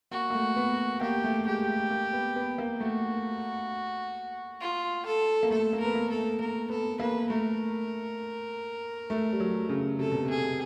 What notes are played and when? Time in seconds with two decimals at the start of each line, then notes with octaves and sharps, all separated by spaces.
0.11 A#3 F#4
0.30 A#3
0.34 A3
0.56 B3
1.01 A#3 G4
1.24 A3
1.47 G#3 G4
1.68 A3
1.91 A#3
2.13 B3
2.36 B3
2.58 A#3
2.80 A3 F#4
4.61 F4
5.06 A4
5.43 A#3
5.50 A3 A4
5.73 A#3
5.80 A#4
5.85 B3
5.95 A#3
6.10 A4
6.18 A3
6.40 A#3 A#4
6.70 B3 A4
7.00 A#3 B4
7.30 A3 A#4
9.10 A3
9.32 G3
9.40 F#3
9.69 C#3
9.99 C3 A4
10.11 B2
10.25 C3 G#4